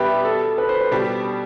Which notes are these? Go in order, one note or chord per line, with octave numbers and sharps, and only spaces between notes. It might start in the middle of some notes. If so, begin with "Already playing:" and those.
Already playing: B2 G3 B3 D4 G4 B4 E5
A4
B4
C5
B4
B2 G3 D4 G4